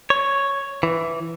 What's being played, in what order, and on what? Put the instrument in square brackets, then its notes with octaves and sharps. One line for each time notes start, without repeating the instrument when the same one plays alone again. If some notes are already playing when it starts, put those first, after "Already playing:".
[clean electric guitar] C#5
E3